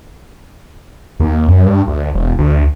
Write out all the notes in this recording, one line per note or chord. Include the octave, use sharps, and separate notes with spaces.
D#2
F#2
G2
D2
E1
D2